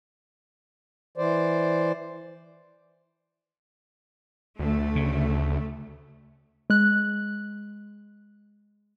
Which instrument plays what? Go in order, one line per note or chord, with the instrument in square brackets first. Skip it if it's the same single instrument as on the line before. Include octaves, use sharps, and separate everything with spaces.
[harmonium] E3 C5 D5
[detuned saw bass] D2 [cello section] A3
[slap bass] C#3
[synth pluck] G#3 F#6